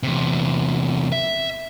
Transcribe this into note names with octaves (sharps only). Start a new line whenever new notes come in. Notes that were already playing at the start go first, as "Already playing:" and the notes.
E2 C3
E5